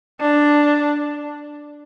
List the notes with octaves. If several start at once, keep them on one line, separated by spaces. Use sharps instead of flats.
D4